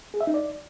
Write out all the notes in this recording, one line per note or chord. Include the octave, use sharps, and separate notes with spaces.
G#4
E5
D#4
D5